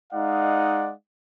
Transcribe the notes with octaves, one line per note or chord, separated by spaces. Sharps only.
G#3 D#4 D5 F5 F#5